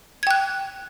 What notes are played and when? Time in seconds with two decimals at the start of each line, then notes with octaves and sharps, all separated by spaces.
0.23 G#6
0.27 G5
0.31 F#6